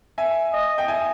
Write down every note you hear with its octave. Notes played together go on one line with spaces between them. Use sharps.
E5 G#5
D#5
G5
E5 G#5